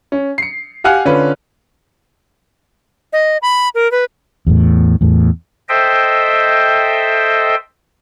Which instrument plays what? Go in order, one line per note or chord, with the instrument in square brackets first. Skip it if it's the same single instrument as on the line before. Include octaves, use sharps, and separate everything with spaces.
[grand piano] C#4
C7 C#7
G4 F5 F#5 G#5 F6 F#6
D3 C#4 F4 B4
[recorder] D#5
B5
A#4
B4
[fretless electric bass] E2 A2
E2 A2
[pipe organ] A4 C5 D#5 E5 G5